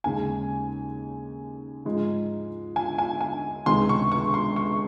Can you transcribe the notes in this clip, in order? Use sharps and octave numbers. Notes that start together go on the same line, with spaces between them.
D#2 C#3 G#3 G#5
G#2 F3 G#3 D#4
G#5
G#5
G#5
C#2 C3 D#3 G#3 C6
C#6
C#6
C6
C#6